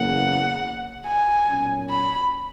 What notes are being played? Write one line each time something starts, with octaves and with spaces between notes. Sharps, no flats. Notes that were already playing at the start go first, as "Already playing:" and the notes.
Already playing: F#1 E2 C#3 F#3 A#3 F#5
G#5
B1 A#2 F#3 C#4
B5